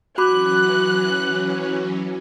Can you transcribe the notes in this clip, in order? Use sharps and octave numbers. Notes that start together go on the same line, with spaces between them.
E3 F#3 C#4 F#4 B5 D6 F#6